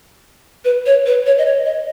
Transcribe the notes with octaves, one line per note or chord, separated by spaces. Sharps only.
B4
C#5
B4
C#5
D#5
C#5
D#5